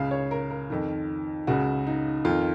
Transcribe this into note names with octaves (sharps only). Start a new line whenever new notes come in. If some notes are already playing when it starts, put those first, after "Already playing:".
Already playing: C#2 C#3 F5
C#5
A#4
A#4
F2 D#3
C#2 C#3 F#4
D#4
F2 D#3 F4